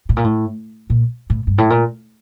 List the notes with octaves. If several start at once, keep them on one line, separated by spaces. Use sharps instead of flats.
A2
A#2
A2
A#2
A2
G2
A2
A#2